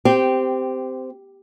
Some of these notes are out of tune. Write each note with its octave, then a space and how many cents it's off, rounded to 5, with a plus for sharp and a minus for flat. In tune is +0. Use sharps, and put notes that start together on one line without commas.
C4 -15 G4 +0